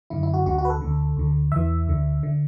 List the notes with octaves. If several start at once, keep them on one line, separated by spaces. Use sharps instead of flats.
F#2 D3 E4
E4
F#4
D2 D3 F#4
F#4
B4
A4
D2 D3
D2 D3
E2 E3 E5
D2 D3
D3